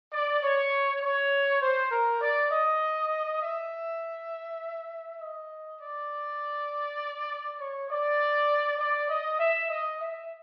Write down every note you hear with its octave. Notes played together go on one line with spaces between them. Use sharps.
D5
C#5
C#5
C5
A#4
D5
D#5
E5
D#5
D5
C#5
D5
D5
D#5
E5
D#5
E5